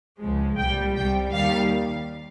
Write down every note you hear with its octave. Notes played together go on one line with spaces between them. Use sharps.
C#2 C#3 F3 G#3
C2 A#2 G3 G5
C2 C3 G3 G5
D#2 D#3 G3 F5